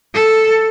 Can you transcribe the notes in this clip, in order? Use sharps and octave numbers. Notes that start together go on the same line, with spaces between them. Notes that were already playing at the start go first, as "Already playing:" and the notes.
A4